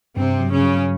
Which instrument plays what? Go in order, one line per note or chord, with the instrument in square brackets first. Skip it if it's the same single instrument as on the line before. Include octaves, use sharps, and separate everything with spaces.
[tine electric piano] G2 [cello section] C3 C4
[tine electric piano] F#3
[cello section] C#3 C#4
[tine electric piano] F#3